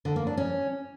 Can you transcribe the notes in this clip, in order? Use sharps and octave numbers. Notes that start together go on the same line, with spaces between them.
D3
A#3
D4
C#4